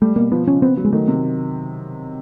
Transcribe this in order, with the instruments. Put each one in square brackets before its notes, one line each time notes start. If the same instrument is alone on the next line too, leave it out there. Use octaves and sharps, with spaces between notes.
[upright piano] G3 [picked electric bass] A3
[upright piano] B2 [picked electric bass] A#3
[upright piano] F3 [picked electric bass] B3
[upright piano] C#3 [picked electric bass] C#4
[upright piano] B3 [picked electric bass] C4
[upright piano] F#3
[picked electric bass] G#3
[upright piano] D#3 [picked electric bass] A3
[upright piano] C3